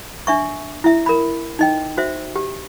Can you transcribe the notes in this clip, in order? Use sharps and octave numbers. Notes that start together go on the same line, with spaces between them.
D4 E5 C#6
E4 E5
A#4 B5
D#4 D#5 G5
F#4 C5 E5
G4